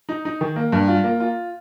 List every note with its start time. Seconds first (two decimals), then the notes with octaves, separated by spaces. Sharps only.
0.09 D#4
0.25 D#4
0.41 D#3
0.56 A#3
0.72 G2
0.88 F4
1.04 A#3
1.20 F4